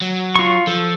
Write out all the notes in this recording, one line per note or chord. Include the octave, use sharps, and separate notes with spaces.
F#3
F4 C#6
F3 A4